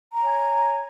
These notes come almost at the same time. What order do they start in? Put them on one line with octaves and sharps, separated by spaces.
A#5 C#5 G#5